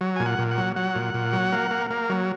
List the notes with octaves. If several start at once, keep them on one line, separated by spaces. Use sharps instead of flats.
F#3
A#2 G#5
F#5
A#2
F#5
F#3
F#3 F#5
A#2
A#2
F#3
A#3
A#3
A#3
F#3